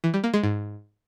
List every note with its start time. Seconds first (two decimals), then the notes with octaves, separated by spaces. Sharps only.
0.04 E3
0.14 G3
0.24 A#3
0.34 G#3
0.43 G#2